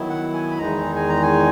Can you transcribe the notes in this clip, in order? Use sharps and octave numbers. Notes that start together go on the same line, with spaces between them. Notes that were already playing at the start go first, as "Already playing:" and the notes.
Already playing: D#3 F#3 B3 E4
F#5
G#5
B5
E2 D#3 G#3 D#4 A#5
G#5
A#5
G#5